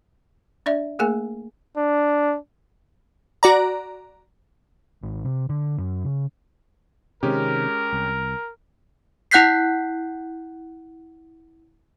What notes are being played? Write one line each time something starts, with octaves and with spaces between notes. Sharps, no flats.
D4 D5 E5
A3 A#3 G#4 A#4 G#5
D4
F#4 D5 A#5
G#1
C3
D3
F#2
C#3
C3 D#3 G#3 C4 C#4 G4 A#4
C2
E4 F#5 F#6 G6 B6 C7